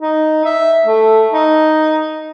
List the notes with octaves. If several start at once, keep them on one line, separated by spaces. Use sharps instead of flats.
D#4
E5
A3
D#4